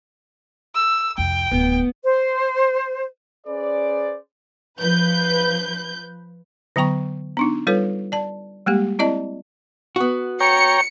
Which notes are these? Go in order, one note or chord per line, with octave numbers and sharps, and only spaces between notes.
E6
C2 F2 G5
D1 B3
C5
C#4 G#4 B4 C5 D5
F3 B4 G6
D3 F#3 B3 G5 C#6
B3 D4 D#4
G3 F4 A4 B4 C#5
D5 A5
G3 G#3 A#3 G4
C4 E4 D5 D#5 A5
B3 F#4
C#5 G5 A#5 C#7